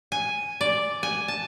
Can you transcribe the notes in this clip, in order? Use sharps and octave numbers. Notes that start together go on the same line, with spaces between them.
G#5
D5
G#5
A5